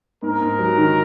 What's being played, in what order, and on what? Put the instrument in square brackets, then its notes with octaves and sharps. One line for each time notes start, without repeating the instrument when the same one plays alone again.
[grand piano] G#2 [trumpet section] A#4
[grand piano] G#2
F#3
D#3